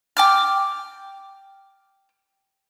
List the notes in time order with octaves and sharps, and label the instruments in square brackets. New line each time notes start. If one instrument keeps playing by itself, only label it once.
[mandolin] G5 D6 F6